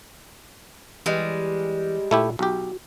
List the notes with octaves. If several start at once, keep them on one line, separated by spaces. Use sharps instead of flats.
E3 G3 G#3
A#2 A3 E4 G4
B1 F#4 G4